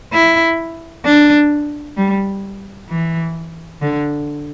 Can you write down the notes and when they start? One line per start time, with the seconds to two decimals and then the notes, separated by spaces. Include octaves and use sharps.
0.13 E4
1.05 D4
1.97 G3
2.90 E3
3.82 D3